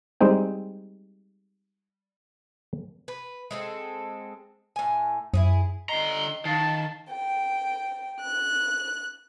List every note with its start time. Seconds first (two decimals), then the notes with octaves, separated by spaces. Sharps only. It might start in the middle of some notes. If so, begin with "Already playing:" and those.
0.21 G3 G#3 C4 D#4 G5
3.08 B4
3.51 G#3 C4 A4
4.76 A2 G#5
5.34 F#2 E4 F#4 G#4
5.89 D3 D#5 A#5 B6 C7 G7
6.45 D#3 F5 A5 A6 C7
7.10 G5
8.22 F#6